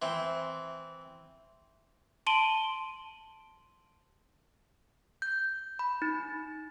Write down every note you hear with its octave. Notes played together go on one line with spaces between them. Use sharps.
E3 C4
A5 C6 D7 D#7 F#7 G7
G6
B5
D#4